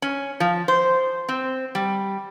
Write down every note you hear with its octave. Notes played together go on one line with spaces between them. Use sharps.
C#4
F3
C5
C4
G3